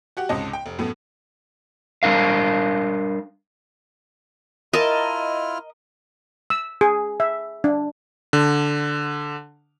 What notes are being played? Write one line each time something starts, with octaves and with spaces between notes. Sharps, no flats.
F#4 G4 F#5
C#2 G#2 C3 C#4 D#5 A5
G5
F1
F#2 A2 A3 B3
G3 D4 A#4 F5
E4 F4 A#4 D#5 A5 F6
E6
G#4
E5
D4
D3